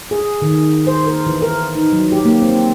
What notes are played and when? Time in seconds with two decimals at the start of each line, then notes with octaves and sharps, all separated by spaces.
0.11 G#4
0.42 D#3
0.87 C5
1.06 A#4
1.26 E3
1.42 A#4
1.75 D#4
1.92 F#3
2.12 G4
2.25 A#3
2.42 C4